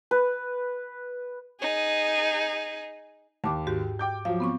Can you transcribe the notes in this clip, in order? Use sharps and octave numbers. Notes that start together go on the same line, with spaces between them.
B4
D#4 G#4
D#2 A5 D6
G#2 F#4 G4
G5 D6 G6
F3 F#3 F5
B3 C4 C#6